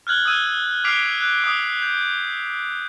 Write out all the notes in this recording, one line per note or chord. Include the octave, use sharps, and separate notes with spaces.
F6 F#6 G#6 F#7
D#6 E6 G#6 D#7
D6 F6 B6 C7 D7 F7
F#6
D6 D#6
G6